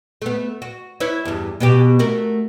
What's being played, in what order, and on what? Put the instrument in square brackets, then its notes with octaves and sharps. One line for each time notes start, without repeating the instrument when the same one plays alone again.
[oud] A3 B3
F#4
E4 B4 C#5
E2 G2
B2 B3 G4
A3 F#4 A#4